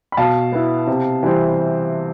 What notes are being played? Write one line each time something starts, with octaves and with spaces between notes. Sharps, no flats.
B5
B2 F5 A5
B3 E4
C3
E3 G3 C4